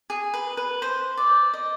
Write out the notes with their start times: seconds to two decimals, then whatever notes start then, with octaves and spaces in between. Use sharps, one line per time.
0.10 G#4
0.34 B4
0.57 B4
0.82 C5
1.17 D5
1.54 D#5